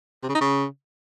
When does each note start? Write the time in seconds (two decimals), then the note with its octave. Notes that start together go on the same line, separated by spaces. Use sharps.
0.23 C3
0.29 C#3
0.35 D#4
0.41 C#3